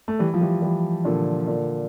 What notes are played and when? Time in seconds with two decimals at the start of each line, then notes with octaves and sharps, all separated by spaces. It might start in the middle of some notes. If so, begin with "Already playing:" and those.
0.08 A3
0.19 E3 G3
0.34 F3
0.41 E3 G3
0.62 E3 G3
1.05 A#2 D3
1.48 A#2 D3